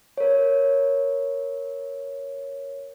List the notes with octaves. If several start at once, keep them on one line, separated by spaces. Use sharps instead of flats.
A#4 C#5